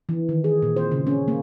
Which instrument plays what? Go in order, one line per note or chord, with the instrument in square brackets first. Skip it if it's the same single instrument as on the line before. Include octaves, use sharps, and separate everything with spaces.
[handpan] E3
D#3
G#4
A#2
C5
C#3
C#4
A#3